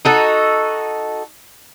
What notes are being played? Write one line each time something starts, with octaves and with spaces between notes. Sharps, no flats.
D#4 F#4 A4